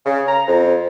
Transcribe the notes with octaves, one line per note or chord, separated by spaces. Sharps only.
C#3
A#5
F2